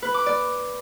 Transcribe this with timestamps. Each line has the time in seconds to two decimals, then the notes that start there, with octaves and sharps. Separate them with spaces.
0.02 B4
0.14 D6
0.26 D5